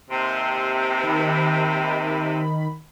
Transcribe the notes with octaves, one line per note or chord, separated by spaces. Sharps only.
D#2 C3 C6
D#3 B5